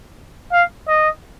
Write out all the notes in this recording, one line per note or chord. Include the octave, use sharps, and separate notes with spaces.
F5
D#5